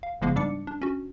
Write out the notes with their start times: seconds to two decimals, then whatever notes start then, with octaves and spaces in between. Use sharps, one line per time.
0.03 F5
0.21 G1 C#3 F3 G#3 A#3 B3
0.36 G#2 G3 D4 D5 D6 C#7
0.67 D4
0.82 C#4 F#4